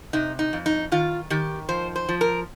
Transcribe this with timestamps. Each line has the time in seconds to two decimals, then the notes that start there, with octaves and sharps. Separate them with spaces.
0.13 C3 D#4
0.39 D#4
0.53 F2
0.66 D#4
0.92 D#3 F4
1.30 D#3 G4
1.69 F3 C5
1.96 C5
2.09 F3
2.21 A#4